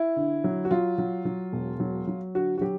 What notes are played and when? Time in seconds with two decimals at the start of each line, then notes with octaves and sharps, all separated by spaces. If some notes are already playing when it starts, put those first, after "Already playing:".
Already playing: E4
0.16 D3
0.44 F#3
0.65 F#4
0.71 F#3 F4
0.98 F#3
1.25 F#3
1.53 E1
1.80 F#3
2.07 F#3
2.35 D3 F#4
2.58 F#4
2.61 F#3 G4